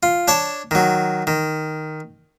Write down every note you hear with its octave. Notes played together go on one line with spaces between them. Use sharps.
F4
D4 C#5 A5
D#3 F#3
D#3